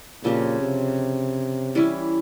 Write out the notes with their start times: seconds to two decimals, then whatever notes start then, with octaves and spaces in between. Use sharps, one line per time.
0.24 A#2 C#3 F3 C4 G4
0.62 C3
1.75 E3 G3 C#4 E4